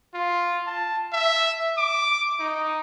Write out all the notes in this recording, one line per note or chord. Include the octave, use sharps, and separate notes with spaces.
F4
A5
E5
D6
D#4